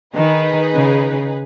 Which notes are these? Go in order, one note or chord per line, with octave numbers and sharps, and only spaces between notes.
D#3 D#4 G#4 B4
C#3